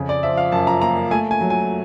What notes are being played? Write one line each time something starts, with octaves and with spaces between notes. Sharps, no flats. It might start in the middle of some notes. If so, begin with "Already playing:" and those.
Already playing: F2 C#3
D5
F3 E5
F5
F#2 A5
A#5
A#3 A#5
A3 G#5
G#5
F#3
G#5